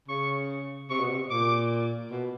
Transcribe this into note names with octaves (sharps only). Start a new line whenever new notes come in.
C#3 C#6
C3 C#6
B2
C3
A#2 D6
B2